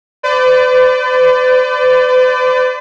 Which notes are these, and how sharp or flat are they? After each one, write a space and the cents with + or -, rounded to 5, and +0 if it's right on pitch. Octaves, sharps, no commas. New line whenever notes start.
B4 +45 D5 +0